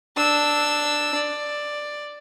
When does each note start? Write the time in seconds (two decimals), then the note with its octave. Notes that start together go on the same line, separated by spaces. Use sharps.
0.17 D4 E6
1.15 D5